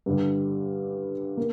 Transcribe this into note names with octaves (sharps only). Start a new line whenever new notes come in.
G2 D3 G3
A#3